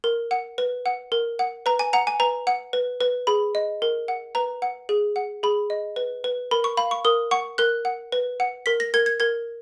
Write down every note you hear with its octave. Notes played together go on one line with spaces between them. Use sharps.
A#4
F#5
B4
F#5
A#4
F#5
B4 A#5
G#5
F#5 A#5
G#5
B4 A#5
F#5
B4
B4
G#4 B5
D#5
A#4
F#5
B4 A#5
F#5
G#4
F#5
G#4 B5
D#5
B4
B4
A#4 B5
C#6
F5 B5
C#6
A#4 D#6
F#5 C#6
A#4 F#6
F#5
B4
F#5
A#4 B6
A#6
A#4 G#6
G#6
A#4 G#6